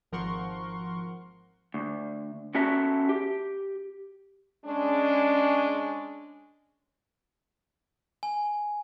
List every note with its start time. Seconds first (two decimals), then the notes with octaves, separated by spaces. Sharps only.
0.12 G#1 F3 A#4 F#5 C6 C#6
1.74 D2
2.55 B3 C#4 F#4 A4 E5 A#5
3.09 G4
4.66 G#3 C#4 D4
8.23 G#5